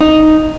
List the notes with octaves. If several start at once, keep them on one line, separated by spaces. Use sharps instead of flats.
D#4